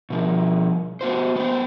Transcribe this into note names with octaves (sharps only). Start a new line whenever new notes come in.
B2 F3
B3 F#4 C5
B3 C5